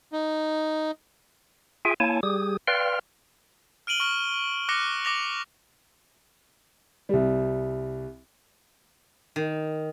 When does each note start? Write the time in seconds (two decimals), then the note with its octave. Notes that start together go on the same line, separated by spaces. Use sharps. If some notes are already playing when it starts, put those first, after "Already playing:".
0.12 D#4
1.85 F4 G#4 E5 G5 G#5
2.00 A#3 E4 C#5 G#5 A5
2.23 G3 G4 G#4 D#6
2.67 B4 D5 F5 G5 C6 F6
3.87 F6 D7 D#7 F#7 G7
4.00 C#6 F6 F#7
4.69 D6 F6 F#6 A#6 C#7
5.05 D6 A#6 F7
7.09 C2 G3
9.36 D#3